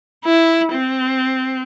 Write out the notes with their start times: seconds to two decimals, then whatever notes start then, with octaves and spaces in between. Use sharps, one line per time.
0.25 E4
0.73 C4